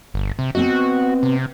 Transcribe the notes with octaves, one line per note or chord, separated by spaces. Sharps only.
G1
C3
B3 C4 F#4 D#5
C3